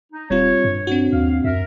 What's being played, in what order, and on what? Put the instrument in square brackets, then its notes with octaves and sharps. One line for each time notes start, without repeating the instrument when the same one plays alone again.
[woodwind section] D#4
[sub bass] D#1 [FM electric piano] G3 C4 F4 [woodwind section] C#5
[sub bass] G2
[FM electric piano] C4 D4 F#4
[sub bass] D#2 [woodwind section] F5
[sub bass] F#2 [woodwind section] A#4 E5